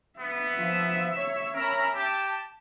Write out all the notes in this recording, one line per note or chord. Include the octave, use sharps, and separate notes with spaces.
B3 E5
F3
C#5
C#4 A#4 A#5 B5
G4 A5